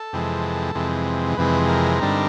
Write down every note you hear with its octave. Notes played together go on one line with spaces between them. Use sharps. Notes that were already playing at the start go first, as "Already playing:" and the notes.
Already playing: A4
F2 C3 E3 G#3
F2 C3 E3 G#3
F2 C3 E3 G#3 B4
A#4
G2 D3 G3 C4 D#4